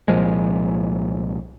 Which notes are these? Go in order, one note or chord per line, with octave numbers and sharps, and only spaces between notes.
C2 A#2 F3 G#3